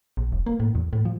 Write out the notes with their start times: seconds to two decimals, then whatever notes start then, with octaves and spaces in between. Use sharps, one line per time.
0.17 A#1
0.32 E1
0.46 A#3
0.60 A2
0.75 E2
0.93 A2
1.05 F3